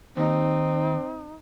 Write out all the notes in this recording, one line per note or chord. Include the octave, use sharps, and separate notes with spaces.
D#2 C4 D#4